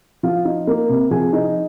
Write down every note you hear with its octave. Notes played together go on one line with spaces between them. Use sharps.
F3 F4 F5
D#4
A#3
C3
F3 G#4 G#5
D#4